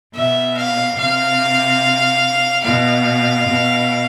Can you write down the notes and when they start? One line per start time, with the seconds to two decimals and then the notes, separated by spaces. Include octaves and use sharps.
0.15 B2 E5
0.57 F5
0.97 C3 F5
2.64 B2 F5
3.47 B2